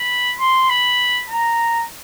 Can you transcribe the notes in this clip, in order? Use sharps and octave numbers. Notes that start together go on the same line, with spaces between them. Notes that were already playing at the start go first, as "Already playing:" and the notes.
Already playing: B5
C6
B5
A#5